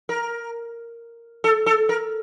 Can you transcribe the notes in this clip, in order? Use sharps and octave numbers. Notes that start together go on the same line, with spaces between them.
A#4
A4
A4
A#4